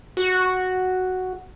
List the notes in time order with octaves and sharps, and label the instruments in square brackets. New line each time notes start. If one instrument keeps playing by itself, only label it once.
[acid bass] F#4